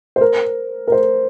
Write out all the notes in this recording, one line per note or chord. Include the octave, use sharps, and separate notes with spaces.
C5
A#4
A#4
C5